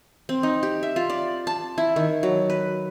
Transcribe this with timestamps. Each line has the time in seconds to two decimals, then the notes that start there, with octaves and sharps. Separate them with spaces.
0.29 C4
0.43 D#4
0.63 G4
0.83 E5
0.96 F4
1.10 D5
1.47 A5
1.78 E4
1.96 D#3
2.23 F#3
2.50 B4